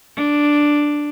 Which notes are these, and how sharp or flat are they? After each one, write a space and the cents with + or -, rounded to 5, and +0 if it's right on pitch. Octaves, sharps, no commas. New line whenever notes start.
D4 +0